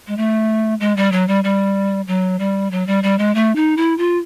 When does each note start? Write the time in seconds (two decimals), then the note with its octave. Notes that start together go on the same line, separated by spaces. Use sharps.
0.07 G#3
0.17 A3
0.80 G#3
0.97 G3
1.12 F#3
1.28 G3
1.44 G3
2.07 F#3
2.39 G3
2.71 F#3
2.87 G3
3.03 G3
3.19 G#3
3.35 A3
3.56 D#4
3.77 E4
3.98 F4